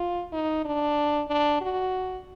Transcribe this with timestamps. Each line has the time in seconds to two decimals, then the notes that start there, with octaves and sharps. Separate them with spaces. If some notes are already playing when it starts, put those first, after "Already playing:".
Already playing: F4
0.33 D#4
0.65 D4
1.28 D4
1.61 F#4